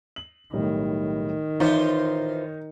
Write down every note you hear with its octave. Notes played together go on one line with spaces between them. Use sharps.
F#7
B1 A2 D#3 G3
E3 D#4 F4 C5 C#5 C#7